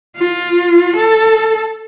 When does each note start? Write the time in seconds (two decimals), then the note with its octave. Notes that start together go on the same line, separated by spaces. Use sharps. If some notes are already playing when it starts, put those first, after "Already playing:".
0.16 F4
0.96 A4